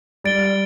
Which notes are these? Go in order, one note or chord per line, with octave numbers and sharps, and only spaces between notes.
G3 A6 D7 G7